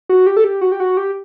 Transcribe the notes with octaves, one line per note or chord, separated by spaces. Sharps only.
F#4
G4
A4
G4
F#4
G4
F#4
G4